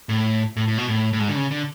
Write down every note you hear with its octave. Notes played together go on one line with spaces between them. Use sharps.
A2
A2
A2
B2
A2
A2
G#2
D3
C#3
D3